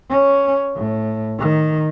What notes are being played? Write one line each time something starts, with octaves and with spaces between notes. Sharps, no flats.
C#4
A2
D#3